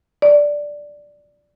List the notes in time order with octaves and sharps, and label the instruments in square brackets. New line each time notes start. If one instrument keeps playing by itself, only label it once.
[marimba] D5